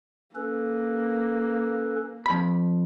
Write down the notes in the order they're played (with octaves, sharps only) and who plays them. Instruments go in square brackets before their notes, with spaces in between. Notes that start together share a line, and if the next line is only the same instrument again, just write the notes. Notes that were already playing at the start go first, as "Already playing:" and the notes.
[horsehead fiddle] A#3 [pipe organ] C#4 A4 B4
[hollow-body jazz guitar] F2 B5